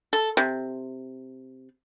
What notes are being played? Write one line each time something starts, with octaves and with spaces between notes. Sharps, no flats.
A4
C3